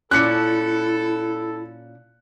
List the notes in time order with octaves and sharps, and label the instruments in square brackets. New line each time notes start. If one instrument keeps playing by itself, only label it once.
[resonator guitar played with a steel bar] A#2 C#4 [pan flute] E4 [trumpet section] A4 [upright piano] F#6 C#7